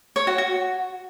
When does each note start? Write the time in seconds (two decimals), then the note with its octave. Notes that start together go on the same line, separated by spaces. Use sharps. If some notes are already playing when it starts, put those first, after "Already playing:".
0.16 C#5
0.27 F#4
0.38 F#4